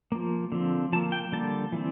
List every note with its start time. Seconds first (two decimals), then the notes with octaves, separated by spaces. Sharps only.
0.12 F3 A#3
0.52 D3 F3 C4
0.93 F3 A5
0.96 A#3
1.12 G5
1.32 D3 G3 A#3 A5
1.72 E3 G3 C4